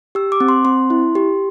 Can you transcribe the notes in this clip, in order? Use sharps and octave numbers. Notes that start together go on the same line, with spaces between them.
G4 E6
D6
C4
C6
C4 C6
E4
G4